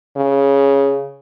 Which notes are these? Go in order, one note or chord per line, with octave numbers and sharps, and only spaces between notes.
C#3